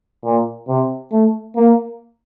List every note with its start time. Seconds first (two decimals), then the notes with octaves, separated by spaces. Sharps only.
0.24 A#2
0.68 C3
1.12 A3
1.56 A#3